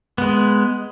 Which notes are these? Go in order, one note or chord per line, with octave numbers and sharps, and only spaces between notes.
G#3 B3